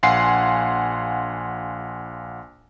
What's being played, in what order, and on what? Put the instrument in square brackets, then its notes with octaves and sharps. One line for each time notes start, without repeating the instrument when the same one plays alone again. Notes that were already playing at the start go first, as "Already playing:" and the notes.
[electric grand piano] A#1 F5 F#5 G#5 C6 C7